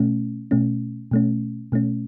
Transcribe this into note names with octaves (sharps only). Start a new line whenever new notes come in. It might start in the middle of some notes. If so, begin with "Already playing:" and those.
Already playing: B2 A3 C#4
B2 A3 C#4
B2 A3 C#4
B2 A3 C#4